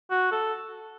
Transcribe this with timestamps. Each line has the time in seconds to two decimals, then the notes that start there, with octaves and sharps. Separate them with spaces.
0.11 F#4
0.32 A4